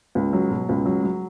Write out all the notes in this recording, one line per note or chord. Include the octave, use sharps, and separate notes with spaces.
C#2
F#3
B2
C#2
F#3
F#3